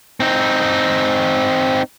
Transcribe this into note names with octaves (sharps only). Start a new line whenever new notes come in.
C4 D#4